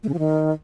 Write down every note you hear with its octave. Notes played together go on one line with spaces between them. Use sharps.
A3
C#3
F3
D#3